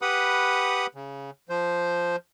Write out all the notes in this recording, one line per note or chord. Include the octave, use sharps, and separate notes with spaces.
G4 B4 F#5 B5 D#6
C#3
F3 C5